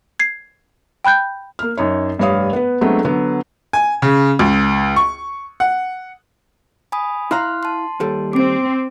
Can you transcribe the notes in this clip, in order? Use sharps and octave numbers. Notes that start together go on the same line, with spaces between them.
G#6 C7
G5 B5 F#6 G6
A#3 F6
F#2 D#4 C#5
F1 G2 B4 C#5 F5 D#6
B3 B4
F#3 G#3 A3 B3 C4 D4
D3 F#3 B3
G#5
C#3
C#2
C#6
F#5
G#5 B5 D#6
E4 F5 A#5 C6 F6 F#6
A5 C6
D#2 G3 A4
C4 D6 D7